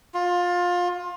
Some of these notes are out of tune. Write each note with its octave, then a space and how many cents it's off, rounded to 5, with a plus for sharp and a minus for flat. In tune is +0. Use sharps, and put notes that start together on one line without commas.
F4 +20